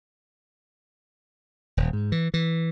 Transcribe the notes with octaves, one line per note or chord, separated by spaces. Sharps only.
D#1
G#2
E3
E3